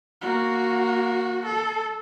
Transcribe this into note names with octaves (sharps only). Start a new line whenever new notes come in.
A#3 F#4
A4